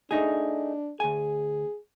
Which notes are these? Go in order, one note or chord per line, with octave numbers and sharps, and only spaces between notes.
A3 D4 D#4 G#4
D2 G#4 G#5